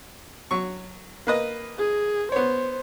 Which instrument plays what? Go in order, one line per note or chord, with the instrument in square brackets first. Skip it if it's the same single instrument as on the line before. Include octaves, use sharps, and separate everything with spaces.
[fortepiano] F#3 C#6
A#3 B4 D#5
[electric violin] G#4
[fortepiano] B3 C#5 [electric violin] C5